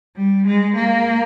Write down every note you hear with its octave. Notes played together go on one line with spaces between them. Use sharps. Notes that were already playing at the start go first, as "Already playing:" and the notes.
G3
G#3
A#3